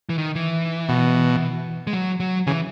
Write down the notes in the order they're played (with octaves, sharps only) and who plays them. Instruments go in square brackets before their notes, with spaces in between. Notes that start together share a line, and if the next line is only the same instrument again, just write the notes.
[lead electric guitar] E3
D#3
E3
[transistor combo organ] B2
[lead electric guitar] G#3
F#3
F#3
[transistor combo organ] C#3 [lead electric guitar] E3